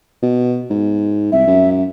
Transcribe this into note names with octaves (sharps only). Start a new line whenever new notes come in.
B2
G#2
C2 E5
F#2